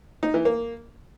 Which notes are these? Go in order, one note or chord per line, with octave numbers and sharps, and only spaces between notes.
D#4
E3
A#3